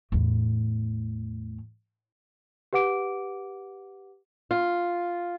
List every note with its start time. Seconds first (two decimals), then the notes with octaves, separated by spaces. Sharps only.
0.12 E2 A2
2.73 G4 B4 F#5 D6 D7
4.51 F4